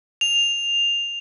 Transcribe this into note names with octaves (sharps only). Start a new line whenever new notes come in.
F7